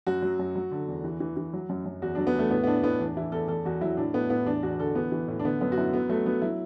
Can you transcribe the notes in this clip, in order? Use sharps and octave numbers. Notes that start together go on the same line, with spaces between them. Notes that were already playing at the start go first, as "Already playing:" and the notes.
F#2 F#4
F#3
F#2
F#3
D3
E2
E3
E3
E3
F#3
F#2
F#2
E2 F#4
F#3 D4
B3
E2 A3
A2 B3
B3
A2 D4
A2 B3
E2 D4
E3 E4
E2 A4
E2 A4
E2 F#4
F#3 E4
A2 D4
A2 B3
A2 B3
E2 D4
E2 F#4
D3 A4
E3 B3
E3
A2
D4
D3 B3
F#2 B3
F#4
F#2 E4
F#3 B3
F#3 A3
F#3 B3
F#3 E4